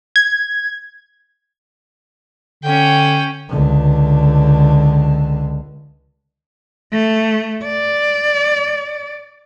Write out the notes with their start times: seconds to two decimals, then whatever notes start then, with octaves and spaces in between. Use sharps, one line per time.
0.16 G#6
2.64 D3 C#4 G5
3.49 C#2 D3
6.93 A3
7.64 D5